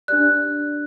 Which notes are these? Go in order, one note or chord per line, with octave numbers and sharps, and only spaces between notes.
D4 G4 D5 F#6